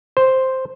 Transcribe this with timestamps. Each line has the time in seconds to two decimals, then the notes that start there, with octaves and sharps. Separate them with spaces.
0.17 C5